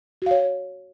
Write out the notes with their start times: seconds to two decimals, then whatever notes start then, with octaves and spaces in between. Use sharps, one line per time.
0.22 F#4
0.26 F5
0.31 C#5